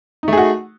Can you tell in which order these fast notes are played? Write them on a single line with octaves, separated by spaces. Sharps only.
D#4 A3 G#4 F#4